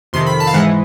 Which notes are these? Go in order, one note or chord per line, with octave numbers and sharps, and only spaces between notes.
F2 C3 D#3 C6
B5
A5
F5
G#2 E3 G#3 F#5